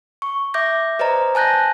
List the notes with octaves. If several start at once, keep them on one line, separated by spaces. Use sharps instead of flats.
C#6
E5 D6 G6 A#6
B4 C5 D5 D#5 A#5
G#5 A5 F#6 G6 A#6